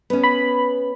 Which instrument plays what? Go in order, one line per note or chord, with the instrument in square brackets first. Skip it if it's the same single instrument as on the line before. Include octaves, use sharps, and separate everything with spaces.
[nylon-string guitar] B3 C#4
[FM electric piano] B5